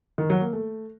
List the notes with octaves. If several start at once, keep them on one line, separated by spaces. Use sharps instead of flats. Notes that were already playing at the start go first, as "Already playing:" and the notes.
D#3
F#3
A#3
A3